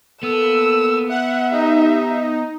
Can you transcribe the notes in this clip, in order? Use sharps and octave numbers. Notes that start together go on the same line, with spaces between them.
A#3 B3 A4 E6
E5 F#5
D#4 G4